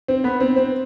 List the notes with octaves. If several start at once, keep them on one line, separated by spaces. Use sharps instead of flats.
C4
B3
C4
C4